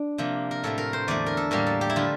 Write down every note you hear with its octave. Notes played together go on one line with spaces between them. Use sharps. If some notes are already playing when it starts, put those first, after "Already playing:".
Already playing: D4
C3 F3 A#3
A#4
A2 F3 A3 A4
A#4
C5
E2 D3 A3 D5
A#4
A4
A2 G3 A#3 A#4
A4
G4
E4
D3 F3 A3 F4